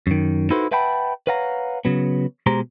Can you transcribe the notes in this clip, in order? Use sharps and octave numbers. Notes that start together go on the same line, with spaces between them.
F#2 D#3
D#4 E4 F#4 A4 B4 C5
B4 E5 F#5 G5 A5 B5
B4 C#5 F5 F#5 A#5
C#3 F#3 B3
B2 G#3 G4 C5 A#5